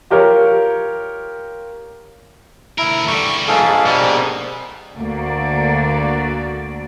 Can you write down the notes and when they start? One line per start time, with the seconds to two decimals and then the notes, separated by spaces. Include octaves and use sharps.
0.10 F4 G4 A#4 C#5
2.78 D2 E4 A#4
3.08 E2 D3 G3 C#6
3.48 A#1 G#2 G#4 A4 F5
3.86 B2 G3
4.96 D2 D3 A#3 F#4 D5